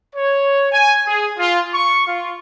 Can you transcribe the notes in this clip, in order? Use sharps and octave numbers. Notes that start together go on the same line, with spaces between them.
C#5
G#5
G#4
F4
C#6
F4